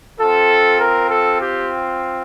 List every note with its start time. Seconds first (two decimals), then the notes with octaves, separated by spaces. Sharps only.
0.19 C4 F4 A4
0.80 A#4
1.10 A4
1.41 G4